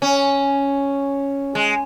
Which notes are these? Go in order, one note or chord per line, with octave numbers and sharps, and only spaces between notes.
C#4
G#3